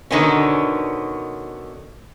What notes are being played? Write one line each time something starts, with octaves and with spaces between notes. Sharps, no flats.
B2 D3 D#3 B3 C#4